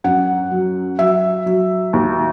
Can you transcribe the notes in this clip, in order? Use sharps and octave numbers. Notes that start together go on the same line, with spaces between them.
F#2 F#5
F#3
F#3 E5
F#3
D#2